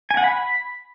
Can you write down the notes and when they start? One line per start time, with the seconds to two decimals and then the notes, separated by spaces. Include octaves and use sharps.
0.11 G#5
0.17 F#5
0.24 B5